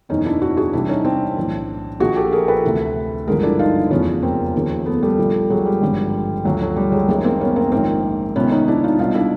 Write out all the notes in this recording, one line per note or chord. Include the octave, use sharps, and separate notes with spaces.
F#1 E2 B2 C#4 D#4
D4 E4
E4 F#4
F#4 G#4
C2 C3 E3 D4 E4
C#4 D#4
C4 D4
B1 A2 E3
A#1 A#2 F3 F#4 G#4
G4 A4
G#4 A#4
A4 B4
D2 C3 E3
G#1 G2 D3 F3 G#4 A#4
D4 E4
D#4 F4
F1 E2 C#3 F3 B3 C#4
A#3 C4
D#2 C#3 F3
A3 B3
G3 A3
A#1 A#2 F3
F#3 G#3
G3
G#1 G2 D3 F3
D2 D3 F3 F#3
F#3
G3
F#3 G#3
F#1 F#2 D#3 G#3 A#3
A#3 C4
B3 C#4
A#3 C4
A#1 G#2 D#3 A#3 C4
C#2 C3 D#3 B3 C#4
C#4 D#4
D4 E4
D#4 F4
C2 B2 D#4 F4
D4 E4